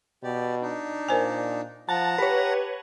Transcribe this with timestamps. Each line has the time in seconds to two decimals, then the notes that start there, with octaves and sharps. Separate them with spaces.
0.23 B2 G4 D5
0.62 D4 D#4
1.09 A#2 A#4 C5 G#5
1.89 F3 F#5 A5 A#5
2.18 G4 B4 C#5